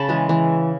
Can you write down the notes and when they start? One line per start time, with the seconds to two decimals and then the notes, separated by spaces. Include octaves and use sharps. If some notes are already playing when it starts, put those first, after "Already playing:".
Already playing: C#3 A5 B5
0.09 E3 G#3
0.29 E3